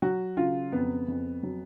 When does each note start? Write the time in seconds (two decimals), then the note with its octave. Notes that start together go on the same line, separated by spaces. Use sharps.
0.02 F#3 F#4
0.37 C#3 F4
0.72 F2 B3
1.08 F2
1.43 F#3